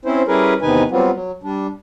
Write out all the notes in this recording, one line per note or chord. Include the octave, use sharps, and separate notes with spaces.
C4 C#4 E4 C5
G3 C#4 E4 G#4 A#4 B4
E2 C3 D#3 D#4 B4 G#5
F#3 G3 B3 C4 F4
F#3
G3 D4